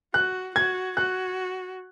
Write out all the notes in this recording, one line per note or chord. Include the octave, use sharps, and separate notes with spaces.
F#4 F#6
F#4 G#6
F#4 F#6